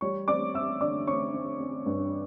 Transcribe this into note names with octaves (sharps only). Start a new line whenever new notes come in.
G3 C#5 C#6
C4 D5 D6
C4 E5 E6
D3 D5 D6
C4 C#5 C#6
C4
C4
G2